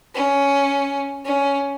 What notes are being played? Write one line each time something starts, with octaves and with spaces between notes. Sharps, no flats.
C#4
C#4